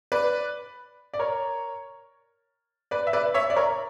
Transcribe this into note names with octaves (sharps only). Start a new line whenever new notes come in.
B4 D5
D5
A#4 C#5
B4 D5
E5
B4 D5
C#5 E5
D5
A#4 C#5